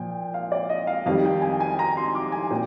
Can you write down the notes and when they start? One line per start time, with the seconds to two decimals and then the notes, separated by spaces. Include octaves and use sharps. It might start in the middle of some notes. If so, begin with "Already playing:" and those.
Already playing: A#2 F3 G5
0.34 F5
0.52 D5
0.69 D#5
0.87 F5
1.06 F2 D#3 G3 F5
1.25 G5
1.42 G#5
1.60 G#5
1.79 A#5
1.97 C6
2.15 D6
2.32 G#5
2.51 A#2 G5